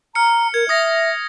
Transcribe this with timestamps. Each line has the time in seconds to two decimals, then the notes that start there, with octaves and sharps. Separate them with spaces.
0.15 A#5 F6 C#7
0.54 A#4 G#6
0.69 E5 D#6 A#6